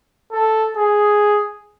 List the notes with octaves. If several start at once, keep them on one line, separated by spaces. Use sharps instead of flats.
A4
G#4